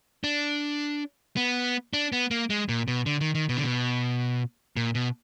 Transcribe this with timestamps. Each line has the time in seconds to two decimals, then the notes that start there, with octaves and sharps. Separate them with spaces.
0.24 D4
1.37 B3
1.93 D4
2.12 B3
2.31 A#3
2.50 G#3
2.69 A#2
2.88 B2
3.06 D3
3.21 D#3
3.35 D#3
3.49 B2
3.57 D3
3.63 B2
4.77 A#2
4.95 B2